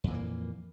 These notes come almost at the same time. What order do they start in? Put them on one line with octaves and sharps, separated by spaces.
F2 A#2 E3 A#3